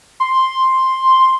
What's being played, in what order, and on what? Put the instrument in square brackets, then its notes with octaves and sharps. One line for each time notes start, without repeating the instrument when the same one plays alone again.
[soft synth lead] C6